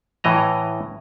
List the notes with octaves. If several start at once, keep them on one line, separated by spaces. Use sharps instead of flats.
A2 E3 D#5 A#5